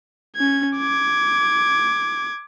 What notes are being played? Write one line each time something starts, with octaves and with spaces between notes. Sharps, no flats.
C#4 G#6
D6 G#6